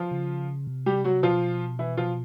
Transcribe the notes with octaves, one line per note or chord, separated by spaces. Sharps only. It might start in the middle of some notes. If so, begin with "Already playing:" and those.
Already playing: F3 F4
C#3
C3
G3 G4
F#3 F#4
B2 F3 F4
E3 E4
F3 F4